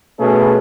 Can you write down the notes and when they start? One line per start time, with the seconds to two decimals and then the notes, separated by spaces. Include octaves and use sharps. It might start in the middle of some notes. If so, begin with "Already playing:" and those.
0.18 B2 A3 C#4 G#4 B4